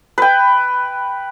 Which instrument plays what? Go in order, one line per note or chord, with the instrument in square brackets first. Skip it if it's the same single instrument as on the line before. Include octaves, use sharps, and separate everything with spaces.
[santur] B4 G5